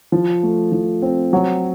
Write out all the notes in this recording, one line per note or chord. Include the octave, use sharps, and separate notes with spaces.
F3
A3
F3
C4
F#3